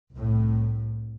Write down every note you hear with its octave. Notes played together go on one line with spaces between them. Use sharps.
C2 A2